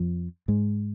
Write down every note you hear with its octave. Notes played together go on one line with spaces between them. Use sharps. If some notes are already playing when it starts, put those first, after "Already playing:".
Already playing: F2 F3
G#2 G#3